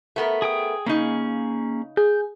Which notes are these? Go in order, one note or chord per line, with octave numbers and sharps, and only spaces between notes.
A3 B3 A#4
G#4 G5 D#6
C#3 A#3 C#4 D#4 G#4
G#4 G6